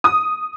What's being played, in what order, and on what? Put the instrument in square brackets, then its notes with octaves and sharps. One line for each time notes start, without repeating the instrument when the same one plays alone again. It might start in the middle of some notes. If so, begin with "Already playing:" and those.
[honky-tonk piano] D#6